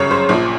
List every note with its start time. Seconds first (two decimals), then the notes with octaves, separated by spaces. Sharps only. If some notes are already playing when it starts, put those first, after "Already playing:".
Already playing: G1 F#2 C#3 C#5
0.11 C5
0.29 A#1 A#2 F3